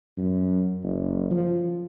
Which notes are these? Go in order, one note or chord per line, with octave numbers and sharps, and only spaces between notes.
F#2
F#1
F3